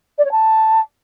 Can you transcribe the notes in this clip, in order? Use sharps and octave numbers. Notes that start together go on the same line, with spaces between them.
D5
C#5
A5